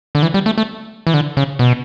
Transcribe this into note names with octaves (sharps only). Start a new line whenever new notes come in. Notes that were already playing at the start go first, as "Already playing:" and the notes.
D3
E3
G3
A3
A3
E3
D3
C#3
B2